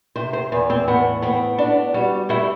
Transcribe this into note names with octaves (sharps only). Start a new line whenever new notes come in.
C3 C5
C5
E2 B4
C4
A2 B3
B3 C4
B3 D4
G3 F#4
A3 E4